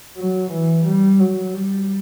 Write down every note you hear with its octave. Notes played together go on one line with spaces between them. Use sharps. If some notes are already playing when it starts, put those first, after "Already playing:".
F#3
E3
G3
F#3
G3